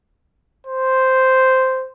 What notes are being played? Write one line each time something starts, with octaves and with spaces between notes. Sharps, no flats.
C5